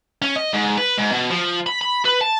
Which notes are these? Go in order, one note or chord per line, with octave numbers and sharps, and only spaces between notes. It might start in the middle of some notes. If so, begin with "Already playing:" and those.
C#4
D#5
G#2
B4
G#2
B2
F3
B5
B5
B4
A5